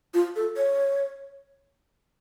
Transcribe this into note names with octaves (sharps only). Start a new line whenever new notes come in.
F4
A4
C#5